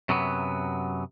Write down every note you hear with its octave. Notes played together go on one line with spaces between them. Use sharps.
F#2 C3 F#3 B3